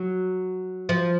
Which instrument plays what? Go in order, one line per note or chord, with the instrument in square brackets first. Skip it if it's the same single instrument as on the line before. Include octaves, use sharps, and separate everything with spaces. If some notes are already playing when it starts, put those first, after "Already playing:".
Already playing: [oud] F#3
F3